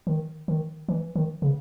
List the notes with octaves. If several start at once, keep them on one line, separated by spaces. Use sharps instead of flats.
D#3
D#3
E3
D#3
C#3